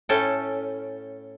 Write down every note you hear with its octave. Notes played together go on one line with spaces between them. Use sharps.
A2 C#4 A4 G5